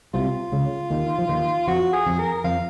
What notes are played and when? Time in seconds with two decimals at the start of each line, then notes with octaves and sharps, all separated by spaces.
0.14 C2 C3 F4
0.52 C#2 C#3
0.90 D#2 D#3
1.18 F3
1.29 D#2 D#3
1.67 F2 F3 F#4
1.93 G#4
2.06 F2 F3
2.19 A#4
2.44 F2 F3 F5